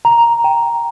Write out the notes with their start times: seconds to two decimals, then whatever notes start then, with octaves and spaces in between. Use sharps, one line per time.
0.05 A#5
0.44 G5